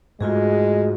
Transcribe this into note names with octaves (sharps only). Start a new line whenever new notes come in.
G#2 G#3 A3 F4 F#4 G#4